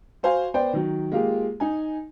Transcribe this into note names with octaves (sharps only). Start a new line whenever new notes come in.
F#4 C5 F5 G#5
B3 C5 D5 G5
D#3 F#3
G#3 A#3 F4 G4
D#4 G#5